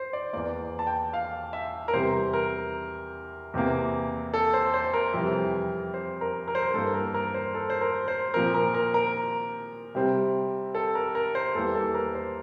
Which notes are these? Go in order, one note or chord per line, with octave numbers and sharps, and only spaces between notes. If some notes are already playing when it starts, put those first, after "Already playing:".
Already playing: C5
D5
E2 E3 A#3 D5
A5
G5
F5
E5
A#4
E2 C3 G3 C5
A#4
E2 C3 E3 A#3
A4
C5
C5
A#4
F2 C3 E3 G3
C5
A#4
A#4
C5
A#4
G2 E3 A#3 A4
A#4
A#4
C5
A4
C5
A#4
C5
A#2 F3 C4 A#4
A#4
A#4
A#4
C3 G3 C4
A4
A#4
A#4
C5
E2 E3 G3 A#3 A4
A4
A#4
C5